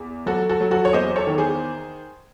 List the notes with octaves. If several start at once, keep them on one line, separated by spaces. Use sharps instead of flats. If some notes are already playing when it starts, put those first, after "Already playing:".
Already playing: E2
F#3 F#4 A4
F#4 A4
F#3
F#4 A4
C#5
E2 C5 D#5
A4 C#5
D#3
G#4 C5